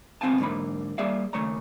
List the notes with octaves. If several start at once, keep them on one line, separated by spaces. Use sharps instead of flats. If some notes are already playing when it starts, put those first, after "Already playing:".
C#2 B3 C4 F5 G#5 A5
G#2 D3 A#3 B5
G3 A#3 G#4 D5 E5 F5
D#2 C#3 A3 C#5 A#5